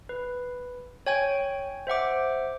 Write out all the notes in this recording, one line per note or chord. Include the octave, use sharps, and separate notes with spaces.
B4
C#5 G5 G#5 G#6
C5 E5 F#5 D6